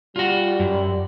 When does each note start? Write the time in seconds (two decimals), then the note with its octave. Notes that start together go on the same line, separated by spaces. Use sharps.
0.16 G3 F4 F#4
0.59 F#2